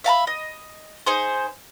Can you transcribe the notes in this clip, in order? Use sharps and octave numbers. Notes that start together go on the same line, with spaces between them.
E5 F5 A5 B5
D#5
D#4 G#4 C5